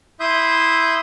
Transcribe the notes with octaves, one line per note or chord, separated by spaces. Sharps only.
E4 E5 C6 D#6 G6